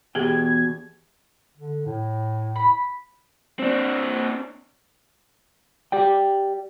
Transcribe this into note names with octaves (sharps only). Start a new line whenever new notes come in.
E2 B2 G4 G#4 G5 G#6
D3
A2
B5
C4 D4
G4 D5 G5